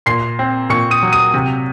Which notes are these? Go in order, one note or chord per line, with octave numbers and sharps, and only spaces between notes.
A#2 C6 C7
C4
A#2 C#6 C#7
D#6 D#7
F#3
D#6 D#7
C3